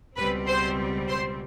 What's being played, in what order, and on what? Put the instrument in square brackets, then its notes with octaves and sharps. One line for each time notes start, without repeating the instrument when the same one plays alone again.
[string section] C#2 B2 G3 C4 B4 B5
C5 C6
C5 C6